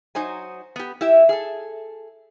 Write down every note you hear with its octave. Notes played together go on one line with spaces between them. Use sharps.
F#3 D#4 C5 G#5
B3 G4
E4 G4 E5
G#4 A4